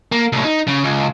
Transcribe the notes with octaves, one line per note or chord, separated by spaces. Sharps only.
A#3
C2 A2
D#4
C#3
C#2